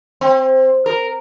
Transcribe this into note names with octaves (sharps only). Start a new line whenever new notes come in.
C4
A#4